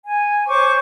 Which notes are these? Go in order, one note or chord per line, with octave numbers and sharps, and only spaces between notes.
G#5
C5 C#5 C#6 D6